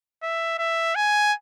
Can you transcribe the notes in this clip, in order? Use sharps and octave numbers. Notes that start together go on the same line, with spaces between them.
E5
E5
G#5